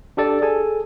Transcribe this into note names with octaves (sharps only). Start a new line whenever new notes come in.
D4 G4 A4 D5
G#4 A4 G#5